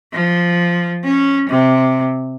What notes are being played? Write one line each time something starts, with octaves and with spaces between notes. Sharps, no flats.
F3
C#4
C3